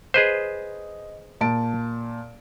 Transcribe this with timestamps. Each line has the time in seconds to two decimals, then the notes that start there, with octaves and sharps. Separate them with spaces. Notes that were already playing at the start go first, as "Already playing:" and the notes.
0.14 G#4 B4 C5 D#5
1.41 A#2 A5 D7